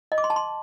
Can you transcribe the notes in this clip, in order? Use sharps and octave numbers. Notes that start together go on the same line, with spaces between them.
D#5
D6
C6
A5
C6